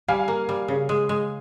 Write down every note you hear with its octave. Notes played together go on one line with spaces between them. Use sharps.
G3 F5 G#5
A#3
G3
C#3
G#3
G#3